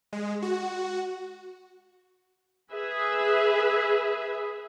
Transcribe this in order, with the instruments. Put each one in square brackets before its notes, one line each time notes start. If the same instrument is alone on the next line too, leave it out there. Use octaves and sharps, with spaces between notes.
[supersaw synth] G#3
F#4
[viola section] G#4 B4 E5